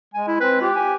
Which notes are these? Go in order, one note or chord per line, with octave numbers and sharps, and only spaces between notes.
G#3 G#5
E4
C4 B4
F4 G4
G#5